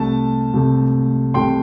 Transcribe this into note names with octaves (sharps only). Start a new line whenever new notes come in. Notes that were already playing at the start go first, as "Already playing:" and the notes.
Already playing: C2 C3 A3 A5
C2 C3 A3
C2 C3 A3 G5 C6